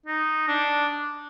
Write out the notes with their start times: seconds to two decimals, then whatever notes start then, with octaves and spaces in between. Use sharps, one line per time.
0.06 D#4
0.48 D4